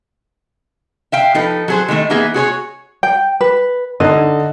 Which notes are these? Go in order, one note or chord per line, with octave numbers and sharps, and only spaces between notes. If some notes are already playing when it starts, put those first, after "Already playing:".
E5 F5 G5
F3 D#4 A4 B4
F#3 G#4 C5
D#3 G#3 A3 D#4
E3 A#3 B3 D#4 G#4 E5
F#4 G#4 C5 C#5
G5
B4
D3 D#4 D#5